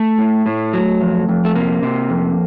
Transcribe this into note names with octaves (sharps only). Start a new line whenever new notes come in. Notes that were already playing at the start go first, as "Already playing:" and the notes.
Already playing: A3
A2
A2
F#3
F2
F2
A3
C3 A#3
C3
F2